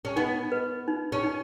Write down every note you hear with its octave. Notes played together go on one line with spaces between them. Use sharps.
C#4
B3 D#4
B4
D#4
C#4
D#4